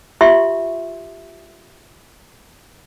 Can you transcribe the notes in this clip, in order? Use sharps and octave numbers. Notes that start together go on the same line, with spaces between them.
F4 G4 E5 C6 C#6